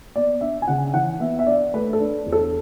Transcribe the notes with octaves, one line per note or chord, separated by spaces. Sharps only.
B3 D5
D4 E5
G#5
C#3 F#5
E3 F#5
B3 E5
E5
D4 D5
A3 B4
A4
D4
E2
A4